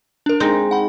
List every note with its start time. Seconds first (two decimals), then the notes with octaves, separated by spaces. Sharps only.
0.26 D4 A#4
0.40 G#3 C4 D#4
0.71 F#5 B5